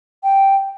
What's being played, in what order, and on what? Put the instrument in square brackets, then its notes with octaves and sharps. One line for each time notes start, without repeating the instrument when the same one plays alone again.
[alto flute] G5